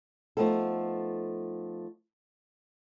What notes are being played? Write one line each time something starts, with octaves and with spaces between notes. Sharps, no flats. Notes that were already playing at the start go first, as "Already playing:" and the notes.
F3 A3 B3 D#4 A4